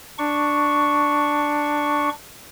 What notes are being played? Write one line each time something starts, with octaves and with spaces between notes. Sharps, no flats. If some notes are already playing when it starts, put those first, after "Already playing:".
D4 C#6